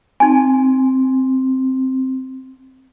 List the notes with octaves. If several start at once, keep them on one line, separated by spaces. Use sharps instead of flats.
C4 D#4 G#5